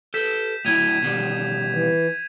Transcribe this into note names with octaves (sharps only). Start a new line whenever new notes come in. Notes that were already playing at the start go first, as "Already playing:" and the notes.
A4 B4 G6 B6 E7
A2 F#3 E4 G#6 D#7 F7
B2 D#3 G3
E3